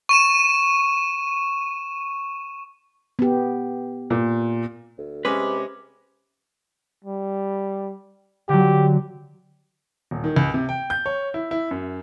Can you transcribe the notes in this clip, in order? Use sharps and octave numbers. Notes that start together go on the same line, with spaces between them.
C#6 D#7 E7
B3 G4
A#2
D2
C3 G#3 C#4 B4 D6
G3
D3 F#3 G4
D#1
D#3
C#2
C3
G5
G6
C#5
E4
E4
F#2